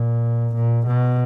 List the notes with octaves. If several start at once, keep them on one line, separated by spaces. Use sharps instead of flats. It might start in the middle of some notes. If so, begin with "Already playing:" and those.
Already playing: A#2
A#2
B2